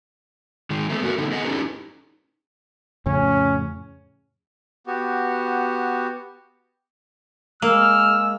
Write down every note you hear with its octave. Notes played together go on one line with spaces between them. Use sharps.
D#3 G#3
G#3 A3 B3
A3 F#4 A#4
D3 A3 B3 D#4
B3 G#4 D#5 F#5
C#4 D#4 E4 G4 A4 B4
F2 A2 C#3 C#4
B3 F#4 G4
G#3 A#3 E6 F6